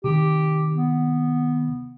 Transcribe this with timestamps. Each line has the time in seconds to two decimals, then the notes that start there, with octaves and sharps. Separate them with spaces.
0.04 C3 D#3 G4
0.76 B3